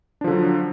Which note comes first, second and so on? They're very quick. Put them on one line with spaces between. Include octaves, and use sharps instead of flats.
D4 F3 D3 F#3